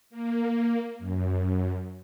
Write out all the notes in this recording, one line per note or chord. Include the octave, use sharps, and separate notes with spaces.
A#3
F#2